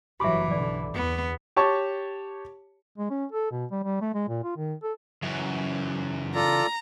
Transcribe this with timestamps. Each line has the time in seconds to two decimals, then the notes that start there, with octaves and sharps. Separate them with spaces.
0.20 F#1 G2 E3 F#3 G4 E5 B5 D6
0.51 B1 D3 D5
0.94 E2 B3
1.56 G4 C#5 A5 C#6
2.98 G#3
3.10 C#4
3.32 A4
3.51 B2
3.71 G3
3.83 G3
4.02 A3
4.14 G#3
4.28 A#2
4.44 F4
4.57 D#3
4.83 A4
5.22 F#2 C#3 E3
6.35 F4 A4 D5 A#5